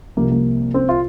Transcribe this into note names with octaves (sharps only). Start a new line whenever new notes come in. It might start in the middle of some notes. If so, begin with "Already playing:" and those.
C2 C3 F3 A#3
A#3
C4
F4